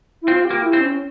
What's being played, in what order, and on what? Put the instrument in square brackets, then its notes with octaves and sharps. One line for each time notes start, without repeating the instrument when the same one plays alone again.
[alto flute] E4
[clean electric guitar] C4 [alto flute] F4
[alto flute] G4
[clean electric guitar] A#3
[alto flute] E4
[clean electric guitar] C4
[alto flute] C#4